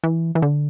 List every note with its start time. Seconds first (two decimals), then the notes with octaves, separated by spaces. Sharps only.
0.03 E3
0.35 E3
0.42 D3